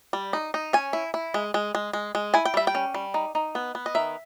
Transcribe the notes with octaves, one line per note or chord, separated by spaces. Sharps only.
G3
D#4
D#4
C#4 G#5
E4
E4
G#3
G#3
G#3
G#3
G#3
E4 G#5
G5
G3 E5
G5
C#4
G3
D#4
D#4
B3
B3
D#5
D#3 E5